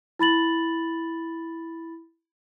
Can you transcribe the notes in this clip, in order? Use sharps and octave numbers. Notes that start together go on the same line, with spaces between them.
E4 B5 A6 F#7